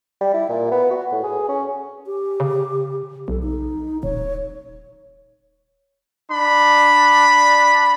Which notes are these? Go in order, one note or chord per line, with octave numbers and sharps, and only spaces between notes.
G3
E4
A#2
B3
F#4
A2
G#4
C#4
G4
C#3
B1 A4
D#4
D#1 C#5
D4 B5